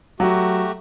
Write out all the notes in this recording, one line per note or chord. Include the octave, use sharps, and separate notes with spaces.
F#3 A3 F#4 G4